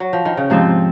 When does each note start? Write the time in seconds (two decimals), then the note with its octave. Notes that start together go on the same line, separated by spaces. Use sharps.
0.00 F#3
0.13 F3
0.25 D#3
0.37 C#3
0.50 G#2 C3 F3 C4